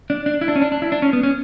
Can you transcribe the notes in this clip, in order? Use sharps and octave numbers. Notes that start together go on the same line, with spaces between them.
D4
D4
E4
D4
C#4
D4
D4
E4
D4
C#4
B3
C#4